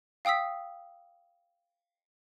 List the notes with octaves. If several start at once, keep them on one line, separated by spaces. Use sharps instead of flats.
F5 G5 D#6 E6 B6